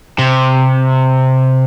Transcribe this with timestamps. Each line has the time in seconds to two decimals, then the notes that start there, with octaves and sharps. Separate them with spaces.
0.19 C3